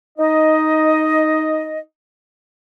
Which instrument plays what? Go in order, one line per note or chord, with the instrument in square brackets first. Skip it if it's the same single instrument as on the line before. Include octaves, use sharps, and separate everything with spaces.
[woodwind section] D#4 D#5